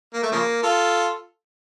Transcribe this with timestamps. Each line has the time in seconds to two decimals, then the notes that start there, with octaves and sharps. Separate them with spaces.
0.13 A#3
0.23 A3
0.32 C#3 F3 A#3
0.63 F4 A4